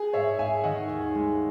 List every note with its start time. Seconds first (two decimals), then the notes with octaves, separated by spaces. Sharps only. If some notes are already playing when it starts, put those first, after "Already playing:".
Already playing: G#4
0.13 G#2 C#5 E5
0.39 G#2 E5 G#5
0.64 D#3 D#5 F#5
0.89 D#2
1.15 G#3